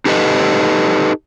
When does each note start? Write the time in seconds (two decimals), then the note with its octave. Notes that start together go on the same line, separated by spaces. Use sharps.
0.06 D#4 G4 A4 B4 D#5